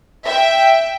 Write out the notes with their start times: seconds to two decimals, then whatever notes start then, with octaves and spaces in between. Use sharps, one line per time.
0.25 E5 G5